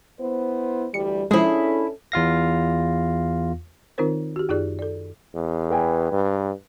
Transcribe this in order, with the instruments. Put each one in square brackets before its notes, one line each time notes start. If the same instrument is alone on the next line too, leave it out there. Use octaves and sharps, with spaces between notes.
[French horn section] B3 E4 C5
[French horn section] D2 E3 G3 [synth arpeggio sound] C#7
[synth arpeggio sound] F3 G#3 [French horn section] C#4 D4 A4 [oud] E4 G#4
[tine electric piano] E2 F4 F5 A#6
[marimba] D#3 C4 D#4 F4 A#4 C5
F#4 G4
F#2 D#4 F4 G4 G#4 D5
A4 D5
[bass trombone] E2
[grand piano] B4 G5 G#5
[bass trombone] G2